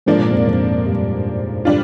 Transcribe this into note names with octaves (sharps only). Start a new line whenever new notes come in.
G#2 D3 F3 A#3 D4
A#2
F2 G#2
F2
G2
D3 G3 D4 F4